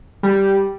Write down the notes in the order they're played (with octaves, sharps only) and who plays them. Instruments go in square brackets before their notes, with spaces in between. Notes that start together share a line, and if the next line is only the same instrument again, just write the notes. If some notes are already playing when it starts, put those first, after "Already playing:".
[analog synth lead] G3